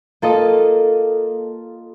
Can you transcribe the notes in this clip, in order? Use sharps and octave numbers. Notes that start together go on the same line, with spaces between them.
A#3 F4 A4 D#5